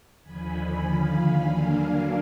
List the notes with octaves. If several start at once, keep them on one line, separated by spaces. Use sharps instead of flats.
D#2 D3 F3 G#5 B5
F5 G#5
D3 F#3 A#3 D4